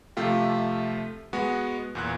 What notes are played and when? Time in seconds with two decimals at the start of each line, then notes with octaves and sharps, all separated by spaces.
0.17 C3 F3 A3 F4 G4
1.33 G#3 B3 F#4
1.95 E2 A#2 F#6